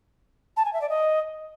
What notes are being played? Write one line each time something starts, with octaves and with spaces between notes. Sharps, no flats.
A5
G#5
E5
D5
D#5